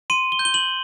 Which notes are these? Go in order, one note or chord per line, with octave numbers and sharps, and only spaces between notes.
C6 D#7
G7
G6
G7
F#7